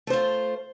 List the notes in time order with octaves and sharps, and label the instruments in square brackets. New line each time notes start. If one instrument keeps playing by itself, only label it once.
[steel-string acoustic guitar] A3
C5
F4